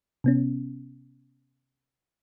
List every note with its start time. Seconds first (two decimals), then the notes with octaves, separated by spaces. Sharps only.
0.24 C3 B3 C#4